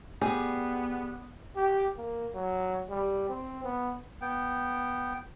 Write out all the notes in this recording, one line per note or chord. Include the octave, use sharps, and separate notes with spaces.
G3 B3 G#4
G4
A#3
F#3
G3
C4
B3
B3 G5